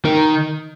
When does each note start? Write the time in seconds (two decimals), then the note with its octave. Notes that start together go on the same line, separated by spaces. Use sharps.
0.05 D#3